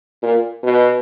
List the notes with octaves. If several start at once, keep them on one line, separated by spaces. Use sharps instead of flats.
A#2
B2